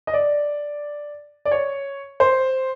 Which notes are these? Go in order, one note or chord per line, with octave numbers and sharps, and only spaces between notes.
D#5
D5
D5
C#5
C5